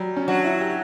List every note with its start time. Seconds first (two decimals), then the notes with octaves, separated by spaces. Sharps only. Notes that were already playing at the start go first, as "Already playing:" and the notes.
Already playing: F#3 G3
0.16 C#4
0.28 F#3 D4
0.44 E4
0.60 G4